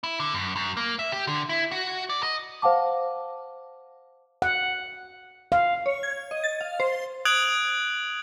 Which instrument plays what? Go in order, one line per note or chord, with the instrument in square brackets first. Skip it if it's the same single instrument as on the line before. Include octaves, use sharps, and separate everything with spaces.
[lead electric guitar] E4
D3
F#2
F#2
A#3
E5
G4
D3
E4
F#4
D5
D#5
[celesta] C5 F5 F#5 A5 D6
[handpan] F#5
F5
[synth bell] C#5
G#6
D#5
A6
F5
C5
[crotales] D#6 F#6 G#6 D7 F7 F#7